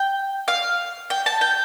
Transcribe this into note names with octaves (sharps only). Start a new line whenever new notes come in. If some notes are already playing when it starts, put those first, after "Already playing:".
Already playing: G5
F5
G5
A5
G5